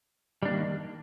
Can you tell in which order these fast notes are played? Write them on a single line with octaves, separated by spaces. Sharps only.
G3 D4 A#3 D#3